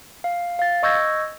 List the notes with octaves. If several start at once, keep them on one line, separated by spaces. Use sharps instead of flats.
F5
F5 A6
D#5 C#6 E6 G6 G#6 A#6